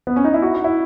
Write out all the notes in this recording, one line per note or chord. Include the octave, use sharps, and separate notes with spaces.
B3
C#4
D#4
E4
F#4
F#4
E4